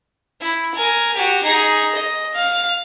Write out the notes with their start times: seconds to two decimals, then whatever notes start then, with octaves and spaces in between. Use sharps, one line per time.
0.41 E4
0.74 A#4 G#5
1.14 F#4 G4
1.43 D#4 G#4
1.95 D#5
2.34 F5